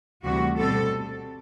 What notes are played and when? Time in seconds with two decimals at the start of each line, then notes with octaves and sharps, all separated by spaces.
0.23 D2 C3 E3 G3 F#4
0.58 B2 G3 C4 A4